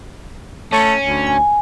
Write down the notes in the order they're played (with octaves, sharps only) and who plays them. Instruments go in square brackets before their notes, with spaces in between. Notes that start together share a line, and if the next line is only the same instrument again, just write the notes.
[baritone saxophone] A3 [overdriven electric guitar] C#4
[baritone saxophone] D2
[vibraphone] G#5